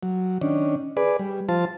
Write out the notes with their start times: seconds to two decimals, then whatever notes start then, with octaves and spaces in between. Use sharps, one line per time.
0.03 F#3
0.41 D#3 C#4 D4
0.97 G#4 B4 D5
1.19 G3
1.49 F3 F4 C5 A5